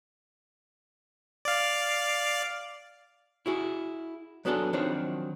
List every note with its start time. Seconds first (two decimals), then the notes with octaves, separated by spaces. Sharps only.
1.45 D5 F5
3.46 E4 F#4 G#4
4.45 F#3 B3 D4 F#4 G#4 A4
4.73 D#3 F3 F#3 C4 D4 D#4